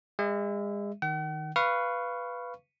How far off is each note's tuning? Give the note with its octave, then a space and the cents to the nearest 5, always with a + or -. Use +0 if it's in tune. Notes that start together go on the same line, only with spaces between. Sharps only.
G#3 -35 E5 +0
D#3 +0 F#5 +45
B4 +0 F5 -15 C#6 +0